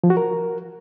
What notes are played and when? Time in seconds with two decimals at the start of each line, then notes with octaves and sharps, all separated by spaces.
0.04 F3
0.10 F#4
0.17 A#4